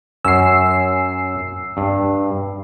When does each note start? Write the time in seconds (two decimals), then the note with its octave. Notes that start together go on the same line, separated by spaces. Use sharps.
0.25 F#2 C#4 E6 C7
1.77 G2